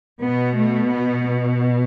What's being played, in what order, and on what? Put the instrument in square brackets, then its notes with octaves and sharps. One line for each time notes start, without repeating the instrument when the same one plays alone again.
[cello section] B2 B3
A3
B3